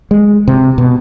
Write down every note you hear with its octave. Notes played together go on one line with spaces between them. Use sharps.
G#3
C3
B2